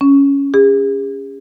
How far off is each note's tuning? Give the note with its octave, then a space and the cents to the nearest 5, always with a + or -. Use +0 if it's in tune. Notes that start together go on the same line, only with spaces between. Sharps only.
C#4 +5
G#4 -40